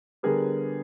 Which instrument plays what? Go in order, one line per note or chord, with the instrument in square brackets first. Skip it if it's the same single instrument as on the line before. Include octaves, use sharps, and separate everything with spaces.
[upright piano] D3 G3 B3 G#4 A#4